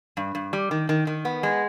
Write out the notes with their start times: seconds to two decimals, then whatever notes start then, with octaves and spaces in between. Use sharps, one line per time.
0.17 G2
0.35 G2
0.53 G3
0.71 D#3
0.89 D#3
1.07 D#3
1.25 B3
1.43 G#3